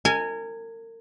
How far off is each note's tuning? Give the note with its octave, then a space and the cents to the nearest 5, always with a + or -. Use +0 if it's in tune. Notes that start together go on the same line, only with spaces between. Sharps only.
A#4 -35 G#5 +0